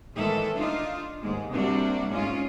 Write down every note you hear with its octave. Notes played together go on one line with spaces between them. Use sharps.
A2 D#3 E3 G#3 A4 E5
D4 D#4 F4
D#2 G#2 G#3
C3 G3 A#3 D4 F#4
G#2 G#3 C#4 F4